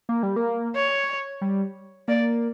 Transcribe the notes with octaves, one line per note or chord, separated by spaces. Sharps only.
A#3
G3
A#3
C#5
G3
A#3 D5